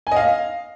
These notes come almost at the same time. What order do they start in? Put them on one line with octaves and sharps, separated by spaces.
G#5 D#5 F5